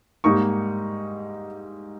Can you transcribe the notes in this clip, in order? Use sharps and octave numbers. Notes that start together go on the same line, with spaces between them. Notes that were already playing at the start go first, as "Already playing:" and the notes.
G#2 G3 A#3 D#4 C#6